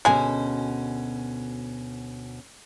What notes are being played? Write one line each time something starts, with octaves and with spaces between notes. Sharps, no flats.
D2 B2 G#3 C#4 G#5